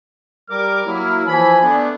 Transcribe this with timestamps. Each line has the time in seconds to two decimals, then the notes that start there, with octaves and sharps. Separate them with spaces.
0.50 G3 A#4 D6 F6
0.86 F#3 A#3 E4
1.27 E3 F3 G#5 B5
1.62 A3 B3 D4